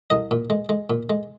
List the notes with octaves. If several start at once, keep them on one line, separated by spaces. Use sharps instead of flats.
C2 D#5
A#2
G#3
G#3
A#2
G#3